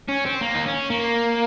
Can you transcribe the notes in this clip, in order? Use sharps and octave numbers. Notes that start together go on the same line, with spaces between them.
C#4
C4
A#3
D#4
C#4
A#3